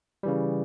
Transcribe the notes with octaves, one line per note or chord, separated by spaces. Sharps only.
C#3 E3 G3